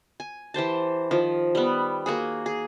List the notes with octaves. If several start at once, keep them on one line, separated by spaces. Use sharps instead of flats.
G#5
E3 G4 C5 A5
D#3 F3
G3 B3
A#3 F#4 G#4
G#4